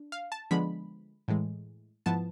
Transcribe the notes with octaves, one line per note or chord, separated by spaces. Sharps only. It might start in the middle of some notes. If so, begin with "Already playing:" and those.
Already playing: D4
F5
A5
D3 F3 G#3 B3 B5
A2 E3 G#3
G#2 F3 B3 E4 A5